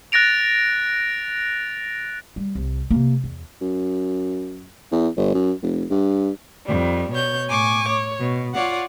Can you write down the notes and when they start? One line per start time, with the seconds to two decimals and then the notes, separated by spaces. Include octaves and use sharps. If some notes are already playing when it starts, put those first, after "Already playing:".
0.12 F#6 A6 A#6 D7 F7
2.36 G3
2.55 C2
2.90 C3 A#3
3.24 E2
3.61 F#2
4.92 E2
5.17 G1
5.34 F#2
5.62 F1
5.90 G2
6.64 F2 G3
7.12 B2 C#5 G6
7.48 A2 G#5 C#6 D6
7.88 C#5
8.19 B2
8.54 F4 C#5 D5 F5 F#5